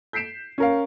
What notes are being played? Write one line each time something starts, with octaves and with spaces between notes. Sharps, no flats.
G6 B6 C7 D7 E7
C#4 A#4 F5